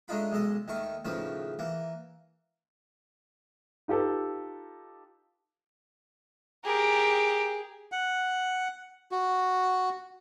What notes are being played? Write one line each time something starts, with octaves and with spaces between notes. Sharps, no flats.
G#3 A3 D4 D#4 F4 B5
B1 G#3 A4 D#5
D#2 D#3 A3 C#6
D#2 A2 C#3 F3 B4
E3 A#3
D#4 F4 G4 A4 B4
G4 G#4 A#4
F#5
F#4